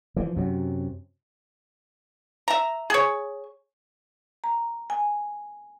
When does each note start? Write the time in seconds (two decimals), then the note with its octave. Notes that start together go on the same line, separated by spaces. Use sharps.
0.16 E3 F3
0.36 F#2 C3 F#3
2.48 E5 A#5
2.90 G#4 C#5
4.44 A#5
4.90 G#5